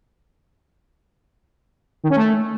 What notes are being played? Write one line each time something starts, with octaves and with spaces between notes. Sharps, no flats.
D#3
C#4
A3